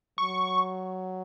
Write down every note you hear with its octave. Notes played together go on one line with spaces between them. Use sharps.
F#3 C#6